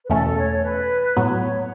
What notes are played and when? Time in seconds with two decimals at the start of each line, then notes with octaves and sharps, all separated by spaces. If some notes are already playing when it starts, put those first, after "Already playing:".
0.05 B4
0.10 E2 B2 A3 C#4 A4
0.37 C#5
0.63 B4
1.16 A2 F#3 B3 C#5